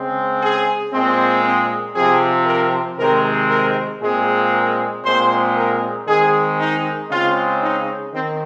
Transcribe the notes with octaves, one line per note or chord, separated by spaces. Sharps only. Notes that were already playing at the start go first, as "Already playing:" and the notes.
Already playing: C#3 G#3 C4
G#4
A#2 G#3 C4
C4
C3 F3 C4 G#4
A#4
C3 D#3 G#3 C4 A#4
A#4
A#2 G#3 C4 G#4
A#4
A#2 G#3 C4 C5
A#4
D#3 G#3 C4 G#4
D#4
C#3 G#3 C4 F4
D#4
D#3 C4